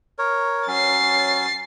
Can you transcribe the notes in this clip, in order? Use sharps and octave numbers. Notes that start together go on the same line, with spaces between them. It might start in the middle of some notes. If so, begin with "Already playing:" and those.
A#4 C#5
F#3 C#4 A6 C7